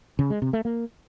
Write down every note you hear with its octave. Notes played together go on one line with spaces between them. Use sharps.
C#3
G#3
C3
A3
A#3